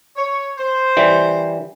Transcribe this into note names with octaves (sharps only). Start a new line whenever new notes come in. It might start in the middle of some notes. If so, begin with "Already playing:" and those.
C#5
C5
E3 G3